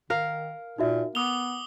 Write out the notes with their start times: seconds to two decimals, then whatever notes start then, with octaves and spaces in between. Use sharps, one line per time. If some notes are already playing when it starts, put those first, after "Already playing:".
0.10 D#3 A#4 F5
0.78 A#2 D#4 F#4 E5
1.15 B3 D6 D#6 F7 G7